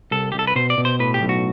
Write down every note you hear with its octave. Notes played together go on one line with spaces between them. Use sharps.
C2 A4
C2 G4
A4
B4
B2 C5
D5
B2
C5
A2 B4
G4
B1
F#4